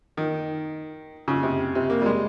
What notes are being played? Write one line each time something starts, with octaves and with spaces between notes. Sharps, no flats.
D#3
C#3
C3
C3
A#3
G3
G#3